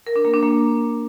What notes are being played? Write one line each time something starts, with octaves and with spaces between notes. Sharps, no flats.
A#4
D4
A#3
D4
A#3